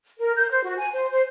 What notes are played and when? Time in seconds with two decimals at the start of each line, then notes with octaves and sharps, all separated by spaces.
0.19 A#4
0.36 G6
0.51 C5
0.64 F#4
0.78 G#5
0.94 C5
1.12 C5